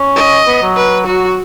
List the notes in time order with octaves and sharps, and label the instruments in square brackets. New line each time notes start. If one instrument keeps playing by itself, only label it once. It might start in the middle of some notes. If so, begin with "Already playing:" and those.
Already playing: [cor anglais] C#4
[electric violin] D#5
[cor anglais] B3
F#3
[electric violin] B4
[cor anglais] F#3 [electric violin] F#4